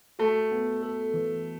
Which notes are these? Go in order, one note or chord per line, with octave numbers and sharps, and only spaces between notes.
A3 F#4
B3
A4
E3